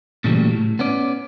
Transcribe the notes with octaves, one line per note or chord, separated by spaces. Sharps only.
A#2 C#3 E3 F#3 G3 A3
A2
B3 C#4 D5